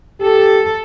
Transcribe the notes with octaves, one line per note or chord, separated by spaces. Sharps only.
G4 A4